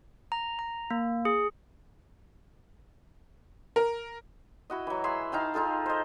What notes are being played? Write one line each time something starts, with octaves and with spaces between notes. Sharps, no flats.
A#5
A#5
A#3
G#4
A#4
E4 F#4 D#5
E3 F#3
G#4 E5 C6
D#4 F5 G5 A5
D#4 F4 G#4 A4
C5 D#5